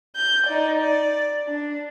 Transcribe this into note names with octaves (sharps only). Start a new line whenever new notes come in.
G6
D#4 D5
D5
D4